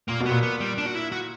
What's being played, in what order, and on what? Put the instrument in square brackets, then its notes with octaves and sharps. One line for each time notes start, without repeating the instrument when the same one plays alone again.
[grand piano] A#2 [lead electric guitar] A#3
[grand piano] B2
[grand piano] A#2 [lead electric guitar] B3
[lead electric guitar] B3
G3
D4
F#4
E4
F#4